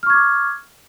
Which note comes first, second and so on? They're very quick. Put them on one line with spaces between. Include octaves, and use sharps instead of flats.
F6 C#6 G#6 D6